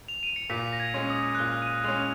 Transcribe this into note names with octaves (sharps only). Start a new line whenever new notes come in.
F7
D#7
C#7
A#2 B6
A#6
G#6
G#3 C#4
D#6
F#6
A#2 F6
D#7
G#3 C#4 F7